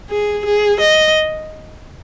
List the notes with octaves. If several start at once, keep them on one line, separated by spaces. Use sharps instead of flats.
G#4
G#4
D#5